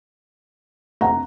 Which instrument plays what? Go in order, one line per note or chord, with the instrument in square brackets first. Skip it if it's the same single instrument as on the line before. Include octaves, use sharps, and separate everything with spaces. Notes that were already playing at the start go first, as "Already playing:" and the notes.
[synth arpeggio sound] F2 C3 A3 [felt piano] F#5 A#5